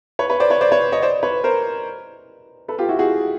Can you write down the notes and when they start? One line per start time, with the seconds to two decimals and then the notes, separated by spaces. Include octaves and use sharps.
0.19 B4 C#5
0.30 B4 C#5
0.40 C5 D5
0.50 B4 C#5
0.61 C5 D5
0.71 B4 C#5
0.92 C#5 D#5
1.02 C5 D5
1.23 B4 C#5
1.44 A#4 C5
2.68 A4 B4
2.78 F4 G4
2.89 E4 F#4
2.99 F#4 G#4